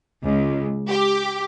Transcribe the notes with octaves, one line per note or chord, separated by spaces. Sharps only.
C#2
G4